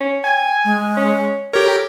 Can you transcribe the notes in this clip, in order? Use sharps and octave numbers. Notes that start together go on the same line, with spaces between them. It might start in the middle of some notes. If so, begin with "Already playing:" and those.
C#4
G5 G#5
G#3
C#4
G4 A4 A#4 C#5